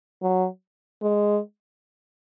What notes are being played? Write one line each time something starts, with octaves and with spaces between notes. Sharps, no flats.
F#3
G#3